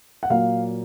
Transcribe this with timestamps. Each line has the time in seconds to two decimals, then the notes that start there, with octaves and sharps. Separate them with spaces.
0.23 F#5
0.30 A#2 F#3 A#3 F5